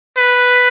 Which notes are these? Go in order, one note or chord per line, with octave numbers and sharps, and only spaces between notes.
B4